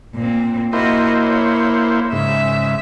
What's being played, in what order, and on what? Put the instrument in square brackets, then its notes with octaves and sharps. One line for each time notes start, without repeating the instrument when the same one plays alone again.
[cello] A#2 C4
[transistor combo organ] A#3 E4 C5 [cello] F#4 D#5
[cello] C#5
[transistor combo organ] G#2 C#3 [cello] E5